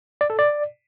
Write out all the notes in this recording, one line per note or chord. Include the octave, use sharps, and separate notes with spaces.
D5
A4
D5